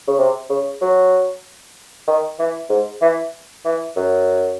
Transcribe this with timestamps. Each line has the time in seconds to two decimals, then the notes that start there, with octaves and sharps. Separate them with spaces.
0.08 C#3
0.19 C3
0.50 C#3
0.81 F#3
2.08 D#3
2.39 E3
2.70 G#2
3.02 E3
3.65 E3
3.96 F#2